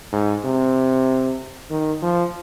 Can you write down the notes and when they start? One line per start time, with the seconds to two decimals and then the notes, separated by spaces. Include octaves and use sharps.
0.12 G#2
0.44 C3
1.71 D#3
2.02 F3